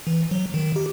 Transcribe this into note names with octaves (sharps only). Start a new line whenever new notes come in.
E3
F#3
D#3
G4